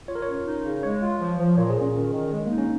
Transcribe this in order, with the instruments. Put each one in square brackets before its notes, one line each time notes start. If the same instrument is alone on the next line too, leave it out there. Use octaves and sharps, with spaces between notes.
[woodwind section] F4 [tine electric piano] C#5
[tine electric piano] A#4
[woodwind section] C#4 [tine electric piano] C#5
[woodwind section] D#4
C#3
[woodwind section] G#3 [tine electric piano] C#5
[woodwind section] F4
F3
F3
[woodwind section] A#2 [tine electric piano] C#5
[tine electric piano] G#4
[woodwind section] A#2
[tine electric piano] C#4
[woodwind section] D#3
D#3
G#3
[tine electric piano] A#3 [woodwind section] D#4
[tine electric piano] C#4